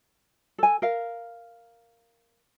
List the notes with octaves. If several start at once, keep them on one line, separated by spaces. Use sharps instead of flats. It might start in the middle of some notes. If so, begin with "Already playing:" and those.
A4 G#5
A#4 F5